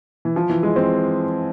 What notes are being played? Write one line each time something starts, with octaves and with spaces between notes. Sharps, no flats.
E3
F3
E3
G#3
C4